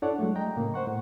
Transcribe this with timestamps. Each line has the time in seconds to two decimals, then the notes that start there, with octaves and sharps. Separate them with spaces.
0.02 D4 E4 A4 C#5 D5 F#5
0.19 F#3 G#3 A3
0.35 D#5 G5 A#5
0.56 A2 C#3 A#3
0.74 C5 F#5 C#6
0.88 A2